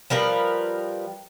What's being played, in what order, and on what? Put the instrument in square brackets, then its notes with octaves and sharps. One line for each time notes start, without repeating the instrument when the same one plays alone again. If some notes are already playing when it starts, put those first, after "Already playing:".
[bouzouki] F3 G3 A#4 B4